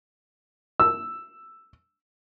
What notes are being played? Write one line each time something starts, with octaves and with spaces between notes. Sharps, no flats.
E6